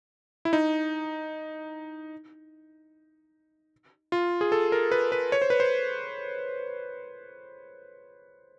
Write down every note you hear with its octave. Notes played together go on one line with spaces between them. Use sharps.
E4
D#4
F4
G#4
A4
A#4
B4
B4
C#5
C5
B4
C5